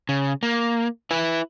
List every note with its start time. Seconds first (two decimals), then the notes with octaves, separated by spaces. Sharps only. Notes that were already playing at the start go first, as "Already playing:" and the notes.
0.09 C#3
0.43 A#3
1.11 E4 B4